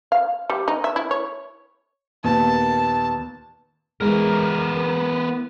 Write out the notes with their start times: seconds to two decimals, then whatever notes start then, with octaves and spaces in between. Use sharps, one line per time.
0.12 F5
0.50 G3
0.68 D#4
0.84 E5
0.96 E4
1.11 C#5
2.24 D#2 A#2 B3 A5
4.01 E3 G#3 B3 A#4